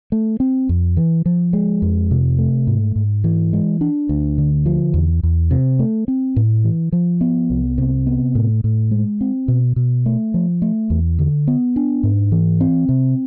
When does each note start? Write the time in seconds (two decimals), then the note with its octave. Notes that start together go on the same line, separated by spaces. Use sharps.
0.12 A3
0.40 C4
0.69 F2
0.97 E3
1.26 F3
1.53 G#3
1.82 F2
2.11 C3
2.39 A3
2.67 G#2
2.96 G#2
3.24 E3
3.53 G#3
3.81 D4
4.09 D2
4.38 D3
4.66 F3
4.94 E2
5.23 E2
5.51 C3
5.79 A3
6.08 C4
6.36 A2
6.64 E3
6.92 F3
7.21 B3
7.50 C2
7.78 C3
8.07 B3
8.35 A2
8.64 A2
8.91 G#3
9.21 C4
9.48 B2
9.76 B2
10.06 A3
10.34 F3
10.62 A3
10.90 E2
11.19 D3
11.47 B3
11.76 D4
12.03 G#2
12.32 E3
12.60 C4
12.89 C3